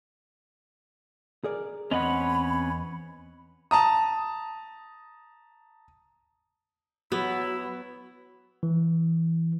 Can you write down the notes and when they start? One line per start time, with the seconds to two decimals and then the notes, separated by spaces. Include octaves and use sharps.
1.44 G#4 A#4 D5
1.91 E2 C4 C#4 B4 C#5 D#5 F#5 B5
3.71 A5 A#5 D#6
7.12 F#3 B3 E4 F#4
8.63 E3